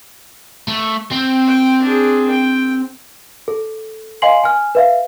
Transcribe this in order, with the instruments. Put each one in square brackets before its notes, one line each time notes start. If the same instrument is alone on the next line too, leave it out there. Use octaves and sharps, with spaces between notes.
[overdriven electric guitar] A3
C4
[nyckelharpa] G5
D4 G#4
G5
[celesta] A4
D#5 F5 G#5 C6 C7 F#7
G#5 F6
B4 E5 F5